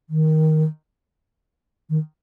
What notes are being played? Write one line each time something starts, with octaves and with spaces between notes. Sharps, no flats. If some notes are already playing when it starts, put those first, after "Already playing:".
D#3
D#3